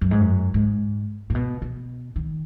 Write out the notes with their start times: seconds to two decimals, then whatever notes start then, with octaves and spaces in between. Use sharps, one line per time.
0.01 F#2
0.11 G#2
0.21 F#2
0.54 G#2
1.30 A#2
1.35 B2
1.62 B2
2.16 D#3